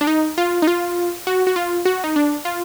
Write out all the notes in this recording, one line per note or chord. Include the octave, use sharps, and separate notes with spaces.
D4
D#4
F4
D#4
F4
F#4
F#4
F4
F#4
D#4
D4
F4